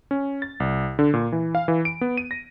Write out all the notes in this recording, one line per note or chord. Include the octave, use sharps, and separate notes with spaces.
C#4
A6
C2
D3
A#2
E3
F5
E3
D7
B3
D#7
A#6